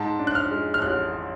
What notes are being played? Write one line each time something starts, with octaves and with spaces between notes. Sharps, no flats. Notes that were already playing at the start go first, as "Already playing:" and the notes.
Already playing: G#2 A5
D4
F#6
F6
G#3
F6
A1 F#6